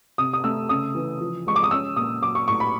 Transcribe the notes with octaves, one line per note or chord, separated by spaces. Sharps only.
C3 D#6
D#6
A3 E6
C#3 D#6
E3
F3
G#3 C#6
D6
D#6
C#4 E6
A#2 D#6
F#3 D6
C#6
A2 C#6
B5